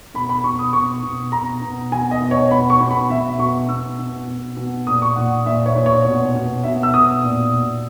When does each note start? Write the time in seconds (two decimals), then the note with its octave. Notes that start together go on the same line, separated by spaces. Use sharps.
0.14 B2 B5
0.29 B5
0.44 B2 C#6
0.59 D#6
0.73 B2 C#6
1.03 B2
1.32 B2 A#5
1.62 B2
1.92 B2 G#5
2.11 D#5
2.21 B2
2.31 C#5
2.51 B2 B5
2.70 C#6
2.81 B2
2.91 B5
3.10 B2 E5
3.39 B2 C#6
3.69 B2 E6
3.99 B2
4.28 B2
4.57 B2
4.87 A#2 D#6
5.02 C#6
5.16 A#2 F#5
5.45 A#2 E5
5.66 C#5
5.75 A#2
5.86 C#5
6.05 B2
6.35 B2
6.63 B2 E5
6.83 E6
6.94 B2 D#6
7.23 A#2
7.53 A#2